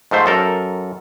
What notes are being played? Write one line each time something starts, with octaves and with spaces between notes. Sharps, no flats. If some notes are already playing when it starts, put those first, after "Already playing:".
G#2 F3 A3 C5
F#2 A4 A#4